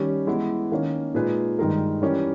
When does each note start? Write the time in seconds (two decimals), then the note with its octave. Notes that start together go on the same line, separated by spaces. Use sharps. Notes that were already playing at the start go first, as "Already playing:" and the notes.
Already playing: D#3 G3 C#4 G4
0.27 E3 G#3 B3 E4
0.72 D#3 A#3 C#4
1.14 A#2 G#3 D#4 G#4 B4
1.59 G2 D#3 G#3 D#4 A#4
2.02 E3 G3 C#4 G4 A#4